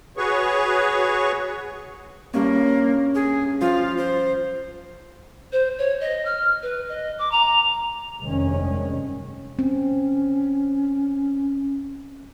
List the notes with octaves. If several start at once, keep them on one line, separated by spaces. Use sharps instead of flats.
F#4 G#4 B4 C#5 C#6
G2 A#3 C#4
G#4
F3 F4
C5
C5
C#5
D#5
F6
B4
D#5
D6
A#5
F1 G2 C3 D#3 G#3 C#4
C4 C#4